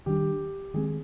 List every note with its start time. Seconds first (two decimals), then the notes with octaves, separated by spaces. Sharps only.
0.06 D#3 G3 D4 G4
0.74 D#3 G#3 C4 G#4